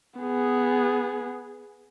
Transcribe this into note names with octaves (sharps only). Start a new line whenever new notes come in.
B3 G#4